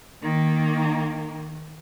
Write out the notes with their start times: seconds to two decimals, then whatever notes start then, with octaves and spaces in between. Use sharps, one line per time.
0.22 D#3 A#3